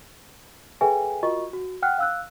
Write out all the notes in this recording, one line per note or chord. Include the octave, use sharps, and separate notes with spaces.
G#4 A4 B4 E5 G5 G#5
F4 F#4 A#4 D#5 C#6
F#4
F#5 G5 F6 F#6
F5 E6 F#6